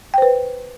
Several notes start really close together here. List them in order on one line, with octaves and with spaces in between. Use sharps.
G5 C5 B4